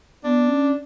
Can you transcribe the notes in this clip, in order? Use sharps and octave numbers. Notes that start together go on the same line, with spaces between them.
B3 D4
C#4